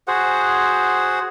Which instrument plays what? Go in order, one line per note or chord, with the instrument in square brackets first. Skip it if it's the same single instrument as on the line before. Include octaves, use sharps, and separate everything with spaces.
[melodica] F#4 G#4 C5 F#5